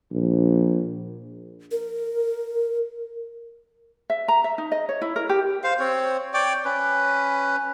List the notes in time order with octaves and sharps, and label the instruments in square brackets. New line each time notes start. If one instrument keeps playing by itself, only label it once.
[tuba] A#1
[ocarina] A#4
[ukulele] E5
A#5
E5
D#4
D#5
C#5
E4
A#4
G4
[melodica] C5 F5
C4 C#5
C#5 D5 G5 D6
C#4 B4